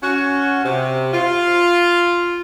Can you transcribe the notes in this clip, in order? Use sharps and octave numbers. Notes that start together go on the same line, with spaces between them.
C#4 F#4
C3
F4